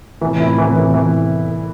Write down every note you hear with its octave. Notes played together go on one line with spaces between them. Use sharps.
A2 C3 E3
E4
E3
E3
E3